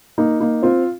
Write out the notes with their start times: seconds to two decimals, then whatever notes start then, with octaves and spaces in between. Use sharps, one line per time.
0.18 A#3 D#4
0.40 A#3 D#4
0.63 C4 F4